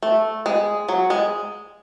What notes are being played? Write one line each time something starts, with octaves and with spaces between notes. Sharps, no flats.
A3
G#3
F#3
G#3